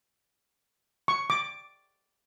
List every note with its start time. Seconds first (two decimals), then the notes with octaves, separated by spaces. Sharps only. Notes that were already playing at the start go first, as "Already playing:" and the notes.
1.08 C#6
1.30 D6